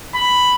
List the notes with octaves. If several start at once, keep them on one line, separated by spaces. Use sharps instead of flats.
B5